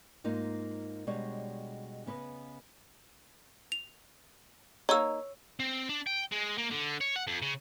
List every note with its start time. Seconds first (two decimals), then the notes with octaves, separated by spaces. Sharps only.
0.24 G#2 A#3 D#4 F4
1.07 B2 G3 G#3 D4 C#5 D#5
2.06 C#3 B3 B4 C5 D#5
3.72 F7
4.89 A#3 D#4 C#5 C#6 E6
5.60 C4
5.89 D4
6.07 G5
6.32 G#3
6.58 A#3
6.71 D3
7.01 C#5
7.16 F#5
7.27 F2
7.42 C#3